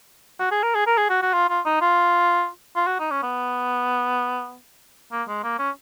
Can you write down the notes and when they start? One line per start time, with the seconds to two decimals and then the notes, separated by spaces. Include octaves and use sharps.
0.39 F#4
0.51 G#4
0.63 A#4
0.75 G#4
0.87 A#4
0.98 G#4
1.10 F#4
1.22 F#4
1.34 F4
1.49 F4
1.66 D#4
1.81 F4
2.76 F4
2.87 F#4
3.00 D#4
3.11 C#4
3.23 B3
5.12 A#3
5.28 G#3
5.43 A#3
5.59 C#4